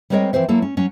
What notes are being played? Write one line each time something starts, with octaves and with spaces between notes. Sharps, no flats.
G3 G#3 C4 A#4 C#5 D#5
E3 F3 C4 C5 E5
F#3 A#3 E4 A4
C#4
F#3 C#4